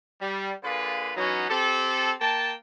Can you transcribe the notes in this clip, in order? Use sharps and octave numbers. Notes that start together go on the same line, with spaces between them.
G3
D3 A#3 F4 G#4 B4
E3 F#3 B3 C#4 D#4
C4 G4 A4
A#3 G5 A5